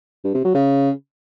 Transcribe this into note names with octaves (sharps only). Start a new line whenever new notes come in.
G2
C3
F#3
C#3